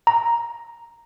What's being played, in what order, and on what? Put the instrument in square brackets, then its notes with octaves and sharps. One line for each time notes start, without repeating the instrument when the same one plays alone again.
[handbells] A#5